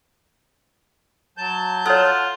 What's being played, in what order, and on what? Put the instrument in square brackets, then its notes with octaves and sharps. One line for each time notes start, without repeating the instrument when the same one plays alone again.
[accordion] F#3 A5 G6
[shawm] F4 [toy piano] A4 C#5 [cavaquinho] F#5